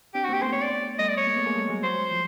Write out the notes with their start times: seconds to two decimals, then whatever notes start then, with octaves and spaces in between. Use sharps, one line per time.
0.15 C4 D4 G4
0.24 F#4
0.29 A#3 C4 G4
0.42 A3 B3 C5
0.53 C#5
0.62 D5
0.99 G3 A3 D#5
1.09 D5
1.17 C#5
1.27 G#3 A#3
1.36 A3 B3
1.46 G#3 A#3
1.55 G3 A3
1.69 F#3 G#3
1.83 F#3 C5
2.11 F3